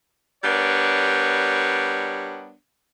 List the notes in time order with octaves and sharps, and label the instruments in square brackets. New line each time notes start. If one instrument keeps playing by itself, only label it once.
[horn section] G3 B3 D4 A#4 C#5